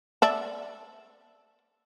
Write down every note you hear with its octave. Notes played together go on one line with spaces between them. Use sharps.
D5 E5 A5